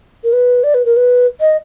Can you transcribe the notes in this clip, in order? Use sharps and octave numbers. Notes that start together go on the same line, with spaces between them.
A#4
B4
D5
B4
A#4
B4
D#5